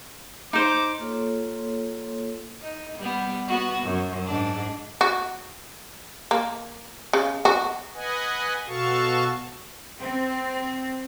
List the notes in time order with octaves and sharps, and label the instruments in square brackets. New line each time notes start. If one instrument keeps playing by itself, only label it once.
[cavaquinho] D#4 C5 [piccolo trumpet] D6
[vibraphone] A#3 F4 A4 C#5 C6
[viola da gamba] D#4
G3 B3
B3 F#4
F#2
G#2 D4
[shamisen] F#4
A#3
C#3
F#4
[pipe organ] B4 D#5 F#5 G#5
B2 F#4 A4 F5 A5 C#6
[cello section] C4